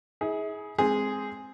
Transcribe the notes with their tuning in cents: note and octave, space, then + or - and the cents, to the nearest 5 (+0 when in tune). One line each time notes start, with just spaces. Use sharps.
E4 -40 G#4 +10
G#3 +0 C4 +0 G#4 +0